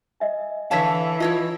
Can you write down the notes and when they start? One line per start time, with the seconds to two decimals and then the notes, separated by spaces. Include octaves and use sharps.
0.20 D#5 E5 G#5
0.71 D3 E3 C#5 F5 A5 B6
1.20 E4 F4 C#5 D#5 A5